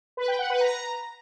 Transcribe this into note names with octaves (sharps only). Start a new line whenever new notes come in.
B4
G5
F#5
B4
A#5